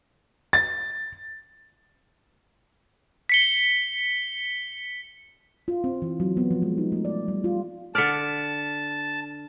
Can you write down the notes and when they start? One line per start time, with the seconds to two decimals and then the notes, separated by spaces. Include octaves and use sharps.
0.53 A6
3.29 B6 C#7 G7
5.68 F4
5.84 C4
6.02 E3
6.20 F#3
6.37 B3
6.51 F3
6.62 G#3
6.78 D#4
6.92 A3
7.05 D5
7.28 G3
7.44 F4
7.95 D3 D5 A5 F6 B6 C#7